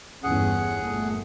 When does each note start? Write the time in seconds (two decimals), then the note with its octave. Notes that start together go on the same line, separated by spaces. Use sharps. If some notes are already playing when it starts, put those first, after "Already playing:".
0.23 G1 E2 C#4 G#4 F#5
0.79 G1 A#2 A3